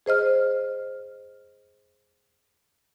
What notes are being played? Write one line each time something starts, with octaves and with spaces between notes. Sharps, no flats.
G#4 C5 D#5 F6